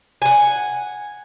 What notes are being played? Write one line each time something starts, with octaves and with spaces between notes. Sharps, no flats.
F#5 G#5